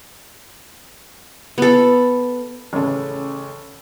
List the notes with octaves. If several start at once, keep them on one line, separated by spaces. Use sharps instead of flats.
B3 A4
A1 C#3 A4